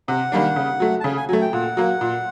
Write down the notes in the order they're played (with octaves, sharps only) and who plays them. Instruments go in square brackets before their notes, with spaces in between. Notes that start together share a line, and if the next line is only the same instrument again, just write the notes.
[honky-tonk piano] C3 [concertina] F#5
[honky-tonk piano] D#3 G3 A#3 D4
C#3
F#3 A3
[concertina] A5
[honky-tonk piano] C#3 [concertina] G#5
[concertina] G#5
[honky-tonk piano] F#3 A3 [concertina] G#5
[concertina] G5
[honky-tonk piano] A#2 [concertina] F#5
[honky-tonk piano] F#3 A#3
A#2